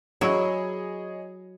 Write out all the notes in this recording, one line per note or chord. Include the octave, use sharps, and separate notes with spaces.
F#3 E4 G#4 C#5 D#5